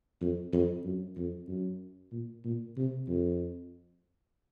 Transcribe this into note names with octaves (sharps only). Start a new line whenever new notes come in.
F2
F2
F#2
F2
F#2
A#2
A#2
C3
F2